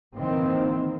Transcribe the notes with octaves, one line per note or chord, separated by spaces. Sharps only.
D#3 E3 A#3 C4